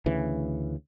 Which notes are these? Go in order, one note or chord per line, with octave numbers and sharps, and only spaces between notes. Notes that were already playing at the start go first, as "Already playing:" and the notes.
D2 C#3 E3